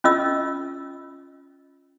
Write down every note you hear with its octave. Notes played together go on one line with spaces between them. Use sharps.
C#4 F4 D#5 E6